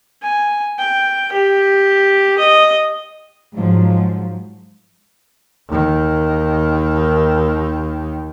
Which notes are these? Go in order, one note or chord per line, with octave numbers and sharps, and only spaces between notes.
G#5
G5
G4
D#5
G#2 F3 F#3
D#2 D#3